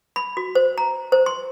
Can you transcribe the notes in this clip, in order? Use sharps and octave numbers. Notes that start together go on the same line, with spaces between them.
B5
F#4
C5
A#5
C5
C6